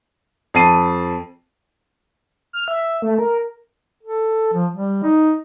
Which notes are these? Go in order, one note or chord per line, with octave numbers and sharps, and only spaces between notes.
F2 A5 C7 D#7
F6
E5
A3
A#4
A4
F3
G3
D#4